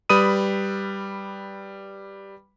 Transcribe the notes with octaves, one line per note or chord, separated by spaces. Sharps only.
G3 B4 B5 D#6 D#7